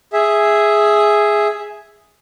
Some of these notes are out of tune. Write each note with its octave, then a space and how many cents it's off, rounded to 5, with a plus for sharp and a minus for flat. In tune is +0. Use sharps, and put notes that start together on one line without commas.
G#4 +0 E5 +0